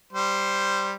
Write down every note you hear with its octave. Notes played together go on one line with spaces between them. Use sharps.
G3 C5